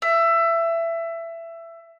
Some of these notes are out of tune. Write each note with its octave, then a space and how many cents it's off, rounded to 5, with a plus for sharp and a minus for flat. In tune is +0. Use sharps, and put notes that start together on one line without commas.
E5 +20